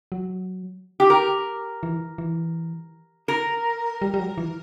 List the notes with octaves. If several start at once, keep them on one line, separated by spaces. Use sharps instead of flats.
F#3
G4
A#4
E3
E3
A#4
G3
G3
F#3
E3